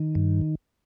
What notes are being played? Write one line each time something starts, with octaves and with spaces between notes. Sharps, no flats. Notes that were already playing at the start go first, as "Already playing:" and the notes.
Already playing: D#3
G2